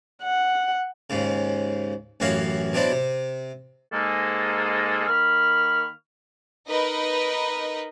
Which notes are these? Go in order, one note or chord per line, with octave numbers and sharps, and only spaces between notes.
F#5
D#2 G#2 C#3
A1 F#2 E3 F#4 C#5 F5
B2 F#3 C4 D4 E4
C3
G#2 G#3 A#3 A4
D#3 A#3 B5 C#6 F6
D#4 A#4 B4 D#5